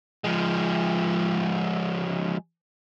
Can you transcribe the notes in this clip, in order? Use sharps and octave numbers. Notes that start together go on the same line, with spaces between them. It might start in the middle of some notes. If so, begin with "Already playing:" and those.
F3 G#3